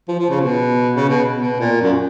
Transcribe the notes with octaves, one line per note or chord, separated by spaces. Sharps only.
F3
F3
C#3
B2
C#3
B2
B2
A#2
F#2